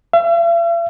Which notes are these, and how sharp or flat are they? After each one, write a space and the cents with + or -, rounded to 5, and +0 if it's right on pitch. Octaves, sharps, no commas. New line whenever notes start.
E5 +45